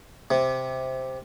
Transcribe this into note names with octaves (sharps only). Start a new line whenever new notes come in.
C3